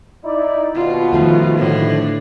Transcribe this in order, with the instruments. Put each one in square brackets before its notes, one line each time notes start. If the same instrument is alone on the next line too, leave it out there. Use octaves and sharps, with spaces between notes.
[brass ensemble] D#4 E4 D5
[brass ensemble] D#2 B2 [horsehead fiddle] F4
[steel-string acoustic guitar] D#3 F3 A3
[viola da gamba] A2 D3 D4